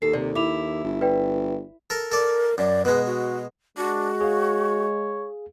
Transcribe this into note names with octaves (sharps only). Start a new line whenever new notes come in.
D#2 A4 C7
C3 D5
E4 D6 F7
G1
B4 D5 G5
A4 A#4
A4 A#4 D5
F#2 D5
B2 G#3 B4
F#4
G#3 D4 F#4
G#4 C#5 F5